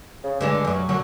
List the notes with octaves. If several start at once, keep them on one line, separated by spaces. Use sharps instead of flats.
C#3
G2 D3 G#3 D4
F#2 F#3
F#2 D3 F#3 F#4